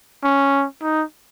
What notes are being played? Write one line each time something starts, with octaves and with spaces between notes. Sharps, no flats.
C#4
D#4